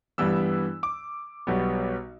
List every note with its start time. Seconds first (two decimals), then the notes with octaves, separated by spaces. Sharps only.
0.18 G2 E3 G3 B3 E6
0.83 D6
1.47 B1 B2 G3 B3